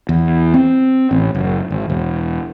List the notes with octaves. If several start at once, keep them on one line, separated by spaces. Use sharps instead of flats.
E2
C4
A1
F#1
G#1
E1